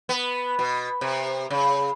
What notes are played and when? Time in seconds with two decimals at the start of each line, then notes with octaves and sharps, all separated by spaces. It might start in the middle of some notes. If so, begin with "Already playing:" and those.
0.09 B3
0.59 B2
1.01 C3
1.50 C#3